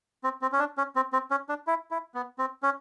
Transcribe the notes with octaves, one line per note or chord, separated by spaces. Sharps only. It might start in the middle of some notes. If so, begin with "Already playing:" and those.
C4
C4
C#4
D4
C#4
C4
C4
C#4
D4
E4
E4
B3
C4
C#4